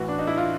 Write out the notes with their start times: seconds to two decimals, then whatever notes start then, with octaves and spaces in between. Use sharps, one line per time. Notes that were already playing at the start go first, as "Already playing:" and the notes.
Already playing: A2 E3 F#4
0.08 D4
0.19 D#4
0.27 E4
0.37 F4